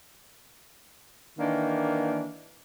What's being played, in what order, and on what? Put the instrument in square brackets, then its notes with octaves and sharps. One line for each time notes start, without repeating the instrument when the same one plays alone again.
[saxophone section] D#3 E3 A#3 D4